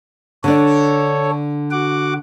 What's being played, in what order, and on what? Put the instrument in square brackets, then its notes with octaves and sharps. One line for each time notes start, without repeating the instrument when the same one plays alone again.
[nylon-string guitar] D3 D4 [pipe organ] A4 C#5
[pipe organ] F#4 F#5 D6